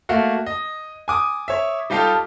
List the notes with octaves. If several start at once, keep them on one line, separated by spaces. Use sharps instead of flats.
A3 A#3 F#4 F#5
D#5
G#5 D6 D#6
C#5 E5
G3 D#4 F4 G4 A4 F5